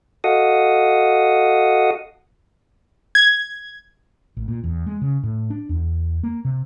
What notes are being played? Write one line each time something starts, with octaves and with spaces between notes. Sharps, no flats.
F#4 A4 D#5 F5 F#5 D#6
G#6
A1
A#2
E2
G#3
C#3
A2
D4
E2
A#3
C3